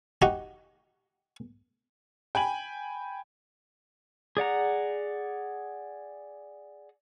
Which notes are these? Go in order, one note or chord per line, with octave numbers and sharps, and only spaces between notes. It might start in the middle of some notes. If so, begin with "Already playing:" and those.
D#4 F#4 G4
G5 G#5 B5 F#7
G#4 D5 F#5 A#5